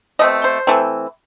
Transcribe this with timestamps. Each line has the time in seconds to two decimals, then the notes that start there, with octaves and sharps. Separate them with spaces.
0.19 B2 A3 C4 D#5
0.44 C5
0.67 E3 A3 C4